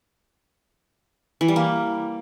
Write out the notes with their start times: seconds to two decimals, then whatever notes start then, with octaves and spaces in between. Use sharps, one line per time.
1.41 E3
1.48 G3
1.56 A#3